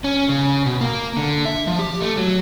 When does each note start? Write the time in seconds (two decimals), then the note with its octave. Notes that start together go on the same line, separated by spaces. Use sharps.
0.04 C#4
0.29 C#3
0.66 B2
0.81 A#3
1.17 D3
1.45 E5
1.67 F3
1.79 G4
2.01 A3
2.18 F#3